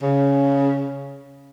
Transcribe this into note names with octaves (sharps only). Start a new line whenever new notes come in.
C#3